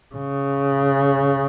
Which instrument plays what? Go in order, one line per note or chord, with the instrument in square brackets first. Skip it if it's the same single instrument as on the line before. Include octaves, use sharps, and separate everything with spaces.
[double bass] C#3